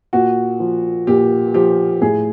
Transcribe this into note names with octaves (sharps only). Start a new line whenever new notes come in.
A#2 F#4
F3
A#2 G4
F3 G4
A2 G#4